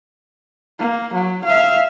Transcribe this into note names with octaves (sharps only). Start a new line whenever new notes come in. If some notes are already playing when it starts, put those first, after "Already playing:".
A#3
F#3
E5 F5